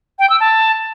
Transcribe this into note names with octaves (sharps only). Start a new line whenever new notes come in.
G5
E6
A5